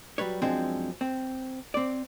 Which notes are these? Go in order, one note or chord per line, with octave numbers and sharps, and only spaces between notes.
F#3 G3 B4 C#5
F#2 F3 G#3 C4 D4
C4
C4 D5